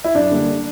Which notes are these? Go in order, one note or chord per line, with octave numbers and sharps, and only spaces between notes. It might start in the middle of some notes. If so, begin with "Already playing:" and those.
E4
F#2 D4
D3 G3 A#3